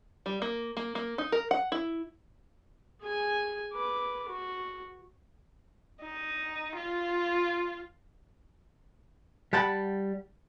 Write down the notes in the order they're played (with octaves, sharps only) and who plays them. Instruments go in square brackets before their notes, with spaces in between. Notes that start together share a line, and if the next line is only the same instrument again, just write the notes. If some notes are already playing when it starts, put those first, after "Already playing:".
[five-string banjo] G3
A#3
A#3
A#3
D#4
A#4
F#5
E4
[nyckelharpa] G#4 G#5
B4 D6
F#4
[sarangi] D#4
F4
[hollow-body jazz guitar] G3 F#5 G5 A5 B5